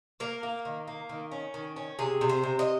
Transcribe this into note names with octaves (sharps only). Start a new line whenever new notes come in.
A#3 A#4
A#3
D#3
A#3
D#3
C#4
D#3
C#4
C3 G#4
C3
C5
C3
D#5